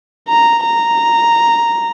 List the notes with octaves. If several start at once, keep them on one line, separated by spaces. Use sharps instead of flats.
A#5
A#5